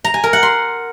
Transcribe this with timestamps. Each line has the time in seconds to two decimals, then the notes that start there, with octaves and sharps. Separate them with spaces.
0.04 A#5
0.14 G#5
0.24 A#4
0.33 F#5
0.43 C6